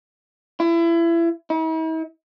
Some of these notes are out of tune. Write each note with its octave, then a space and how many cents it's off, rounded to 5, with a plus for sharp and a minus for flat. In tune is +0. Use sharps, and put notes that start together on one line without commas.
E4 +30
E4 -45